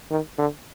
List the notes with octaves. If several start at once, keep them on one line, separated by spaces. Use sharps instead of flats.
D#3
D3